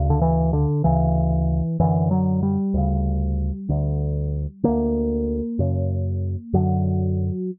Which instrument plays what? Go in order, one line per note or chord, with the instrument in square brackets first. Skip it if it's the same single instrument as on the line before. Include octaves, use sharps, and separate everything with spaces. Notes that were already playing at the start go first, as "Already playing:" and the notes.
Already playing: [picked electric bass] D2 C#3
D3
E3
D3
D2 C#3 E3
F#2 D3 E3
F#3
G3
D2 C#3
D2 D3
D2 D3 A#3
F#2 C#3
F#2 D3 F#3